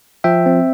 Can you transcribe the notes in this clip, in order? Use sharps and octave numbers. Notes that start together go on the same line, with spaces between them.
F3 E5 G5
C4